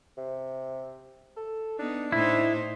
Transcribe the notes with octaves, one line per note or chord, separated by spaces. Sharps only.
C3
A4
B3 D4 D#4
A2 D#4 E4 C5